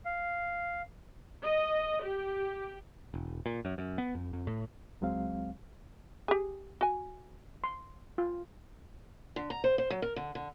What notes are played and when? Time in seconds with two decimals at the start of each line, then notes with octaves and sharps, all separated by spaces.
0.05 F5
1.44 D#5
2.02 G4
3.14 E1
3.46 A#2
3.65 F#2
3.78 F#2
3.98 B3
4.15 F2
4.33 F2
4.47 A2
5.01 C#2 F#3 G#3 C4 F5
6.28 G4 G#4
6.81 F#4 G#5
7.64 C6
8.18 F4
9.36 D3
9.50 A#5
9.64 C5
9.78 C5
9.90 F#3
10.02 A#4
10.16 D3
10.35 D3